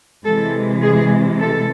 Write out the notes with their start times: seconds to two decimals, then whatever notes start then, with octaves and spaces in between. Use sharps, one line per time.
0.24 C3 E3 G#3 A4
0.82 G#4
1.40 A4